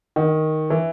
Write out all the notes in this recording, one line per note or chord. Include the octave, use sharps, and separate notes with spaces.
D#3
E3